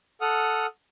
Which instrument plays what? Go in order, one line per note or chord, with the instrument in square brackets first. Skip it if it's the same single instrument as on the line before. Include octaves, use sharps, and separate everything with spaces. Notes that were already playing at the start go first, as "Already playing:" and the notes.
[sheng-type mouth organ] A4 F#5 D#6 F6